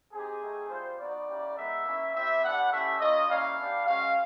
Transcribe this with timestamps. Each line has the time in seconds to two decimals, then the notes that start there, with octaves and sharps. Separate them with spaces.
0.13 C4 D#4 G4 G#4
0.41 A3 C4 D#4 G4
0.70 G3 C4 F4 C5
0.99 B3 D#4 F#4 D5
1.28 A#3 C#4 E4 G4
1.56 G#3 B3 D#4 E5
1.85 A#3 C#4 E4
2.14 C4 E4 G4 E5
2.42 B3 D4 G4 F#5
2.71 A3 C#4 E4 G4 E5
3.00 A#3 C#4 F4 D#5
3.28 G3 A#3 C#4 E4 F5
3.57 B3 D4 G4
3.86 G#3 C#4 F#4 F5